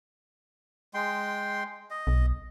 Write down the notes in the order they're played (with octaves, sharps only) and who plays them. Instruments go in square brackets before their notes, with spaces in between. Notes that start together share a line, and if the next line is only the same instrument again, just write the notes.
[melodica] G#3 G5 C6
D#5
[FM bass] B1